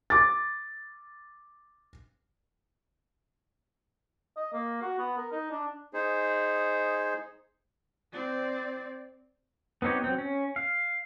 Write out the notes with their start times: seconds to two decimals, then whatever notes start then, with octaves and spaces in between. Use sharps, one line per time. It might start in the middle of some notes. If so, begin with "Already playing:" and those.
0.10 D6 A6
4.37 D#5
4.53 A#3
4.82 F#4
4.99 B3
5.17 A#4
5.32 D#4
5.51 D4
5.94 D#4 G#4 C5
8.13 C4 D5
9.82 B3 C4 D#4 G4 C#5
10.04 F#3 C4
10.18 C#4
10.56 F5